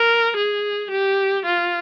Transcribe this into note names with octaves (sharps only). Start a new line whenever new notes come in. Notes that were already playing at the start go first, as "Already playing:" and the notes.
Already playing: A#4
G#4
G4
F4